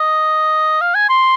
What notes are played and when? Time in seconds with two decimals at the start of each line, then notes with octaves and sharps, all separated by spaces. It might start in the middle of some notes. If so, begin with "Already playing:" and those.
Already playing: D#5
0.81 F5
0.95 G#5
1.09 C6